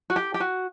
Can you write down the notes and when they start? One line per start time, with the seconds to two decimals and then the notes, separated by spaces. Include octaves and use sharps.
0.10 F#4
0.16 G4
0.34 G4
0.40 F#4